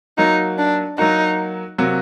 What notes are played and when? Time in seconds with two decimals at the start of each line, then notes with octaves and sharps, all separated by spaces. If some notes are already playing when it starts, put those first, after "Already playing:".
0.17 F#3 A#3 D#4 F#4
0.58 D4
0.98 F#3 A#3 D#4 F#4
1.78 C3 F#3 A#3 F#4